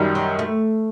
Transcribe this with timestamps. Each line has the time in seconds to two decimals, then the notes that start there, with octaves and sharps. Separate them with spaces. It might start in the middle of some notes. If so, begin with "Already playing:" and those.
Already playing: F#2 D#3 G3
0.15 F#3
0.39 A3